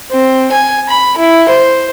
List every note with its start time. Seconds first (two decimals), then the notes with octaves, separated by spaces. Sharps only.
0.11 C4
0.52 G#5
0.89 B5
1.17 E4
1.49 C5